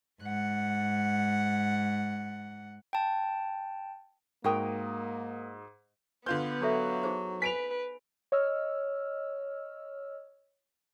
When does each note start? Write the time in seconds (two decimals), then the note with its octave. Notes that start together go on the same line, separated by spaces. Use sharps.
0.22 G#2 F#5
2.93 G5 A5
4.44 G#2 A#3 F#4 A#4 G5 D#6
6.26 D3 B3 F4 B4 C6 G6
6.61 F#3 D4 A4 E5
7.03 D#4 G#4 C5
7.42 B4 G#5 B6 D7 F7
8.32 C#5 D#5 E6 F6